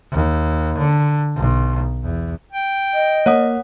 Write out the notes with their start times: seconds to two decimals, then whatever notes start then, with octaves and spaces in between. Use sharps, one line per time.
0.11 D#2
0.78 D3
1.35 B1
2.03 E2
2.52 G5
2.94 D#5
3.26 A#3 C#5 F#5 D#6